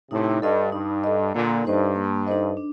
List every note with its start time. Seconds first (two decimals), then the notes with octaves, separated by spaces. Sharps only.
0.11 A2 C3 D#4
0.41 G2 A4 D#5
0.72 G2 D#4
1.04 A4 D#5
1.34 A#2 D3 A#3
1.65 G2 D#4 A4 C5 D#5
1.96 A#3
2.27 D#4 A4 C5 D#5
2.57 D4